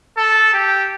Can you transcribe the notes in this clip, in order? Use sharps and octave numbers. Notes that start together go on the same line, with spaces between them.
A4
G4